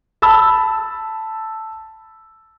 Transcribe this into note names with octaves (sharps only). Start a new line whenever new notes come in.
A5 B5 E6